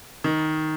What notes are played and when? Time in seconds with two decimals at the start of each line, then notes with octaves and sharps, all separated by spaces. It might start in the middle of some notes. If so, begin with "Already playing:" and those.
0.24 D#3